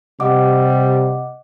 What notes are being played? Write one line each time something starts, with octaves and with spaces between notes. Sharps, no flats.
C3 G3 D#5 F#5 D6